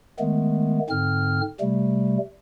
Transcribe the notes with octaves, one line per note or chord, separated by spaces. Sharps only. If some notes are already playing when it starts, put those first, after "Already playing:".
D#3 G#3 A3 B3
G#2 D3 C4 F6
C3 G3 A3